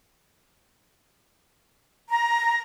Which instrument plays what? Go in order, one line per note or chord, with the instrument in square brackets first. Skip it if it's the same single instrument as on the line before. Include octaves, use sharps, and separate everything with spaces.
[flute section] A#5